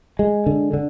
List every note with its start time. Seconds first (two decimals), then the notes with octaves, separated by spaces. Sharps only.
0.19 G#3
0.46 D3
0.74 D3